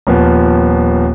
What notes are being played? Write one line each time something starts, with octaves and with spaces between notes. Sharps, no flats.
D#1 F3 B3